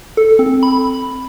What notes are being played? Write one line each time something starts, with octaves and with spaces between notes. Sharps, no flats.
A4
C4
B5